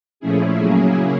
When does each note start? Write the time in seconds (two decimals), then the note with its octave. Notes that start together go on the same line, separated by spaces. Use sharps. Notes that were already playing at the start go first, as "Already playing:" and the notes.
0.20 A#2 F3 A3 C#4 E4 G#4
0.58 C#3 F#3 A#3 C#4 E4 G#4